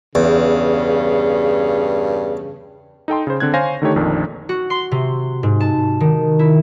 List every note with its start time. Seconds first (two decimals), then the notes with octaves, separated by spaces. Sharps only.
0.15 E2 G2 C#3
3.08 D#4 A4 G5 C6
3.27 C#3 C5
3.40 D3 C4 F#6 G#6
3.54 C5 C#5 F5 G#5 A#6
3.82 D3 D#3 A3 D#4 G4 C#5
3.96 A#1 F2 D#3 D4
4.49 F#4
4.70 C6
4.91 C3
5.43 G#2
5.60 A5
6.00 D#3
6.39 E4